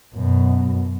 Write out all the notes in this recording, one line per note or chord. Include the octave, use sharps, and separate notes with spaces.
F#2 B2